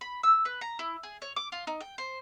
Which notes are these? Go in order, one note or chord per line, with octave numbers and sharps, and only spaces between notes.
B5
E6
B4
A#5
E4
G#4
C#5
D6
F4
D#4
G5
C5